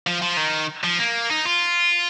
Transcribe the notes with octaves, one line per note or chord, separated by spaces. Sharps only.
F3
F3
D#3
F3
A#3
D#4
F4